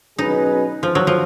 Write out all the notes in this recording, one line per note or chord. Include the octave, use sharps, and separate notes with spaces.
B2 F#3 C#4 D#4 G#4 B4
F3
F#3
F3